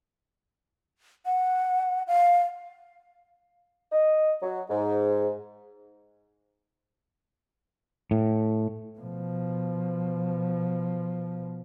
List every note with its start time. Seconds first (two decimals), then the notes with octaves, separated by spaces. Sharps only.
1.25 F#5
2.07 F5
3.92 D#5
4.42 F#3
4.70 G#2
8.11 A2
8.99 B2 F3